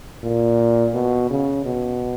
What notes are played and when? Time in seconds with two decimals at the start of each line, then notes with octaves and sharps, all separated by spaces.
0.23 A#2
0.94 B2
1.30 C#3
1.65 B2